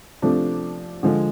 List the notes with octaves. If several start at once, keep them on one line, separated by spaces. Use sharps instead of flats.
C3 F3 A3 D4
D3 F3 G#3